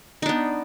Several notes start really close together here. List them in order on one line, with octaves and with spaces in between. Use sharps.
D#4 D4 B3